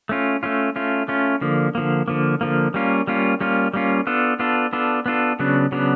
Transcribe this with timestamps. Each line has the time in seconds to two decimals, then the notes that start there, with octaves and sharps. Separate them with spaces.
0.09 A3 C#4 F4
0.43 A3 C#4 F4
0.76 A3 C#4 F4
1.08 A3 C#4 F4
1.41 D3 F3 A#3
1.75 D3 F3 A#3
2.08 D3 F3 A#3
2.41 D3 F3 A#3
2.74 G3 A#3 C#4 F4
3.07 G3 A#3 C#4 F4
3.41 G3 A#3 C#4 F4
3.74 G3 A#3 C#4 F4
4.07 B3 D4 F4 A4
4.39 B3 D4 F4 A4
4.73 B3 D4 F4 A4
5.06 B3 D4 F4 A4
5.39 C#3 F#3 B3 D4
5.72 C#3 F#3 B3 D4